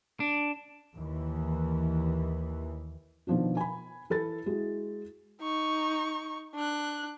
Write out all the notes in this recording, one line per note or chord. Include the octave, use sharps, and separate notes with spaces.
D4
D#2 E3
B2 D#3 F3 D4 F4
G#5 B5
E3 A4 B5 A6
G#3 E4 F#4
D#4 C#6
D4 F#6